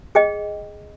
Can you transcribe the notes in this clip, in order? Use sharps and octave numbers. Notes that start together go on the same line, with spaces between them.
G#4 D#5 G5